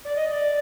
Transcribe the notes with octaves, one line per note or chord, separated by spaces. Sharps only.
D5
D#5
D#5
D5